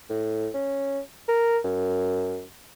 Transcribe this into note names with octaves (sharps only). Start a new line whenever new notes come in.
A2
C#4
A#4
F#2